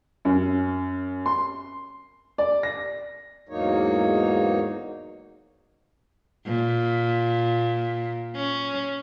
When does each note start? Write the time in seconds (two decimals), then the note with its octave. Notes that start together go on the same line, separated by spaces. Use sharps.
0.25 F#2
1.26 C6
2.38 D5
2.63 A#6
3.49 E2 G#2 F#3 A#3 D#4 C#5
6.47 A#2
8.35 C#4